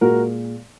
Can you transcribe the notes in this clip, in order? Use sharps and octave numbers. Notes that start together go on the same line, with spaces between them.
A#2 G#3 F#4 A#4